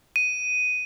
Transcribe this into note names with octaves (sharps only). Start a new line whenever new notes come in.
D#7